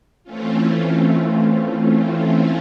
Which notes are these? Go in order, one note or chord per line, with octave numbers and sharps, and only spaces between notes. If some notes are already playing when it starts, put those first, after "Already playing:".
E3 A3 C4 C#4 F4